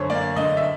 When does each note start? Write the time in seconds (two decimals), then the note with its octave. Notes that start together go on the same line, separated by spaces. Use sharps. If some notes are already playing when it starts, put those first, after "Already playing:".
Already playing: F#2 D3 C5 C#5
0.10 A#3 D5
0.36 D3 D#5
0.57 E5